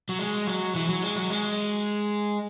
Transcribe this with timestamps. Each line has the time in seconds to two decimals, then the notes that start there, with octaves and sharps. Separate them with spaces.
0.09 F#3
0.19 G#3
0.47 F#3
0.75 E3
0.89 F#3
1.03 G#3
1.16 F#3
1.30 G#3